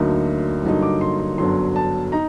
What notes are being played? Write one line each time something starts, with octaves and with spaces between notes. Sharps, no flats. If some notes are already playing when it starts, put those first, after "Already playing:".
Already playing: D2 D3 F#3 A#3 D#4
G2 D3 F#3 A#3 D#4
D6
C6
C6
G1 F#2 D3 F#3 C6
A5
D#4 A#5